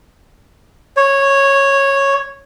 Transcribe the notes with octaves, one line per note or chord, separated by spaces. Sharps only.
C#5